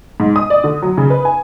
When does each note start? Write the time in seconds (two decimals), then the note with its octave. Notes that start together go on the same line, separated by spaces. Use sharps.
0.20 G#2
0.36 D#6
0.50 D5
0.64 D3
0.82 F#3
0.98 C#3
1.10 B4
1.25 G#5